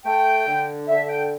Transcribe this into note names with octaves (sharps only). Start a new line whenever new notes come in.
A3 G5
D3
D3 E5
G5